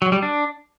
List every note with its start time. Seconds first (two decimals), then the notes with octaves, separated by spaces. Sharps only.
0.02 F#3
0.12 G3
0.22 D4